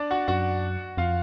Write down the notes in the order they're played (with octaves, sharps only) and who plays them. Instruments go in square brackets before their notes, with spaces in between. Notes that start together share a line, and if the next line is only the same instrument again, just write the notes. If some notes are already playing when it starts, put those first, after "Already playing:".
Already playing: [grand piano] D4 D5
F#4 F#5
[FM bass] F#2 [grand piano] F#4 F#5
[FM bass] F2 [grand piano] F4 F5